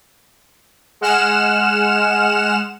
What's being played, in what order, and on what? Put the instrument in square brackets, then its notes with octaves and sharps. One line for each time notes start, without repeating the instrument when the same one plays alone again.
[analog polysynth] G#3 F#5 F6 E7